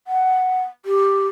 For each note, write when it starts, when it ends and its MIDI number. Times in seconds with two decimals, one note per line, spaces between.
0.07 0.62 78
0.86 1.27 67